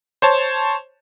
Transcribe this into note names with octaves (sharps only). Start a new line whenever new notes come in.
C5 C#5 A5